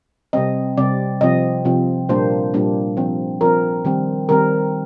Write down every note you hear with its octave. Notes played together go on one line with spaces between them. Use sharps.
C3 G3 C4 D#5
C3 G3 C4 D5
C3 F3 C4 D#5
C3 F3 C4
A#2 G3 A#3 D4 C5
A#2 G3 A#3 D4
F3 C4
F3 C4 A#4
D#3 G3 C4
D#3 G3 C4 A#4